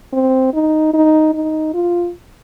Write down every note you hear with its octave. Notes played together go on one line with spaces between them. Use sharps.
C4
D#4
D#4
D#4
F4